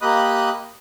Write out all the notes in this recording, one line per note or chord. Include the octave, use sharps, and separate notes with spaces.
A#3 G4 D#5 B5 D#6 F#6